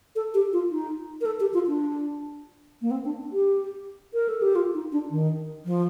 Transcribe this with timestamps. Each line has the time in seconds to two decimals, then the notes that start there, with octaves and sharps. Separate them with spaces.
0.16 A4
0.34 G4
0.53 F4
0.71 D#4
1.21 A#4
1.26 A4
1.40 G4
1.54 F4
1.68 D4
2.82 A#3
2.91 C4
3.05 D4
3.32 G4
4.14 A#4
4.28 A4
4.42 G4
4.55 F4
4.74 D#4
4.92 D4
5.11 D#3
5.66 F3